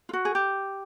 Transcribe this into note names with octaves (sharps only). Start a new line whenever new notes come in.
F4
F#4
G#4
G4